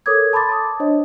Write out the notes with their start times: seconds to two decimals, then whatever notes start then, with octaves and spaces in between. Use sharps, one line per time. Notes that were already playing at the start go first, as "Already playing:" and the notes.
0.06 A4 A#4 C#5 D6 D#6 G#6
0.33 A5 B5 C6 D6 A6
0.49 A5 D#6
0.80 D4 C5 C#5 D#5